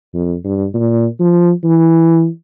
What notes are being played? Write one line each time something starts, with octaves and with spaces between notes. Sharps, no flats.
F2
G2
A#2
F3
E3